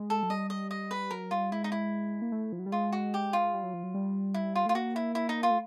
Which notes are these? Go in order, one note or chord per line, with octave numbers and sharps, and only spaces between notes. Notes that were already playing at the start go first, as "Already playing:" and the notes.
Already playing: G#3
A4
F#3
G3 D#5
D#5
D#5
B4
F#3 A#4
G3 F4
G#3 E4
D#4
E4
A#3
A3
F3
F#3
G3
G#3 F4
F#4
G4
F4
G3
F#3
F3
F#3
G3
E4
F4
A3 F4
A#3 F#4
E4
E4
D#4
F4
A3